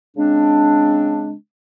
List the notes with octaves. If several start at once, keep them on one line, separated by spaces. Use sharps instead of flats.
C#3 G#3 C4 D4